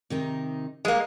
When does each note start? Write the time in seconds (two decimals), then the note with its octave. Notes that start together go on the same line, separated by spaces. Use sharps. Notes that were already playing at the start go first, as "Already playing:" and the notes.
0.10 C3 D#3 D#4
0.85 G3 G#3 A#3